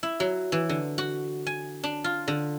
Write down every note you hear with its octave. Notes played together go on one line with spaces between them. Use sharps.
E4
F#3
E3
D3
F#4
G#5
D4
F4
D3